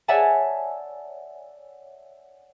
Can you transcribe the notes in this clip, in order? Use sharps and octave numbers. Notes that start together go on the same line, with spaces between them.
C#5 D5 E5 F#5 G#5 A5